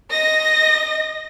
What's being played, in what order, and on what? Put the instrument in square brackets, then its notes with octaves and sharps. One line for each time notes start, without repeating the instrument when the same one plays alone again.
[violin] D#5 A#6